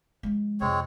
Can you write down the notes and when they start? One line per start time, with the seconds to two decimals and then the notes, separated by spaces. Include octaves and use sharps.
0.23 F3 G#3
0.61 F2 C3 G#3 C4 C#5